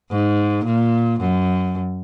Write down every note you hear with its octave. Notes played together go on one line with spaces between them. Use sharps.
G#2
A#2
F#2